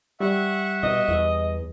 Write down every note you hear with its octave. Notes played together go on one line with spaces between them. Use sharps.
G3 E5 F#5 C#6
B2 D#5
E2